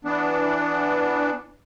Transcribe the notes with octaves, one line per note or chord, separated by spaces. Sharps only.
E3 B3 D4